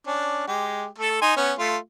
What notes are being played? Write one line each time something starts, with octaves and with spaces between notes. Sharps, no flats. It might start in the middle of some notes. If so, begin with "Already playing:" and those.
C#4 D4
G#3 G4
A3 A4
D#4 G#5 C6
B3 C#4
A3 F4